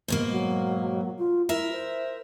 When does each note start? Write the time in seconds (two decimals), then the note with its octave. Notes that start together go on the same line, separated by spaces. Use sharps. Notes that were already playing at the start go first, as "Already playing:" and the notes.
0.08 G#2 B2 A#3
0.30 F#3
1.18 F4
1.49 E4 A#4 E5
1.72 C5